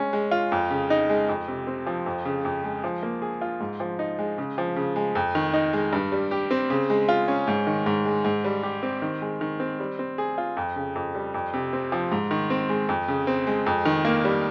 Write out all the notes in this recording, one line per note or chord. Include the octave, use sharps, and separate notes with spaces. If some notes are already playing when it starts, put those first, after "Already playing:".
Already playing: G#3 C#4
G#3
F4
F2
C#3
D#4
G#3
F2
C3
C4
F3
F2
C#3
F2
G#3
F3
A#3
G#4
F4
G#2
F3
D#4
G#3
C#3
F3
C#3
G#3
F2
D#3
D#4
G#3
G2
G3
G4
C4
C#3
G#3
F4
C#4
G#2
D#3
G#2
G#3
G#2
G3
G4
C4
D#3
G#3
D#3
C4
G3
C4
G#4
F4
F2
C#3
F2
G3
F2
C3
C4
F3
G#2
D#3
C4
G#3
F2
C#3
C4
G#3
F2
D#3
A#3
G3